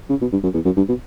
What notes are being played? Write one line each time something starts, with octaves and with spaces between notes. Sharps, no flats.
C#3
B2
G2
F#2
E2
F#2
G2
B2